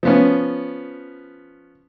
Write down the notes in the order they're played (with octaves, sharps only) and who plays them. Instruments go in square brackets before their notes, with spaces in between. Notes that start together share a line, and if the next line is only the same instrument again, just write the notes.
[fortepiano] F3 B3 C#4